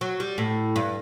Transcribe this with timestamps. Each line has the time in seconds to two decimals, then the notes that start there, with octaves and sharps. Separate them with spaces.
0.01 F#3
0.20 G3
0.38 A2
0.76 G2